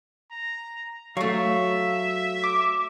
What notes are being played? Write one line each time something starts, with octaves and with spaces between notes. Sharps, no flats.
A#5
F#3 A3 E5 F5 C#6
D6